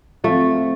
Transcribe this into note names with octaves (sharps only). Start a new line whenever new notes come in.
F3 A3 C4 F4